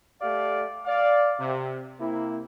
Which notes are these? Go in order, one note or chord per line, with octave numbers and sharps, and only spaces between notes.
A3 G4 D5 F5
D5 F5
C3
C3 A#3 E4